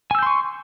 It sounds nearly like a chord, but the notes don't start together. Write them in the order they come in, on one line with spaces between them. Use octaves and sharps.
G#5 E6 G6 C6 C#6